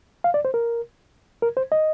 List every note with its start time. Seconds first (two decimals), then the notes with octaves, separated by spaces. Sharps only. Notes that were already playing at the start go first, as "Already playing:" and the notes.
0.24 F5
0.34 D5
0.45 C5
0.54 A#4
1.42 A#4
1.57 C5
1.72 D#5